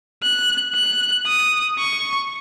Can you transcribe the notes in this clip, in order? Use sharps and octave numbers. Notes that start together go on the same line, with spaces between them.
F#6
F#6
D#6
C#6